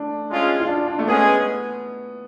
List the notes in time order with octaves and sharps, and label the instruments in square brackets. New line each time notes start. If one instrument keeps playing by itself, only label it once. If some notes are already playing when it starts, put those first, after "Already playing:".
Already playing: [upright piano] A3 D4
[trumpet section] G#3 C#4 F4 G#4
[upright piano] F4
D4
D4
A3
[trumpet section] G#3 C#4 G#4 [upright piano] B3